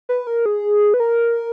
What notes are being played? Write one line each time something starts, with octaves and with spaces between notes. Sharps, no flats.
B4
A#4
G#4
B4
A#4